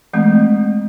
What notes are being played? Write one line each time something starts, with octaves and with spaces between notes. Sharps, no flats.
E3 G#3 A3 C4